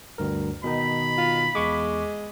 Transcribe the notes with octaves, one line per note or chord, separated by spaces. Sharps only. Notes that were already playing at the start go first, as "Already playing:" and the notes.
D2 G2 A#4
B2 D#3 D#4 B5
F4
E2 G#3 C#6 D6